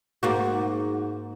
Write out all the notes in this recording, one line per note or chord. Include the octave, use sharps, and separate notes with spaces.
G#2 A#3 F#4